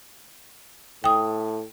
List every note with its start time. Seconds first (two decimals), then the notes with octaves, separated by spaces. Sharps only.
1.04 A2 G5 D#6